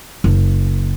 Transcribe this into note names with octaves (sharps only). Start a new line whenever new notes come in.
F#1